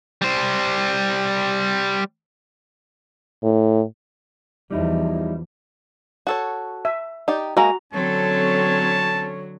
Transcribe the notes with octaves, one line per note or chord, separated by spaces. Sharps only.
G3 C5
A2
E2 F3 G3 D#4 E4
F#4 A4 C#5
E5
D#4 G4 D5
G#3 A#3 F#4 A#5
D3 F#3 C4 C#4 A4 C#5 A5